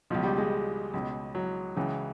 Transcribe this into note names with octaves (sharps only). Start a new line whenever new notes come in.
C#2 B2 F3
G3
G#3
C#2 B2
F#3
C#2 C#3 E3